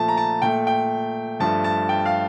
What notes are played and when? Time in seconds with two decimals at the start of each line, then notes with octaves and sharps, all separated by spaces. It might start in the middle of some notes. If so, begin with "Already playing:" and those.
Already playing: A#2 F3 A3 A5
0.08 A#5
0.17 A5
0.42 A#2 A3 G5
0.67 G5
1.40 G2 F3 A3 A5
1.64 A5
1.89 G5
2.05 F5